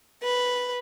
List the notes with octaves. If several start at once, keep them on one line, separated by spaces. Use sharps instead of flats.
B4